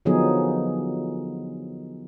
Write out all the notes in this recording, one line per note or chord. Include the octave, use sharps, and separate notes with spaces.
D3 F3 F#3 B3 D#4 G#4